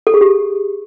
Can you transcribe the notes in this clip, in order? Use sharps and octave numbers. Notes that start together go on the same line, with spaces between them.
A4
G#4
G4